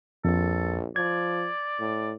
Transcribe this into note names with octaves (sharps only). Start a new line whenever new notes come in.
A#1 F2 A4
F3 D5 G#6
A2